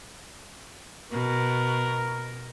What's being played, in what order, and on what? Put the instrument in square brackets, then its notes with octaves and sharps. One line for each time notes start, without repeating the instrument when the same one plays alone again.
[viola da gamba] B2 [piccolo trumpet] A#4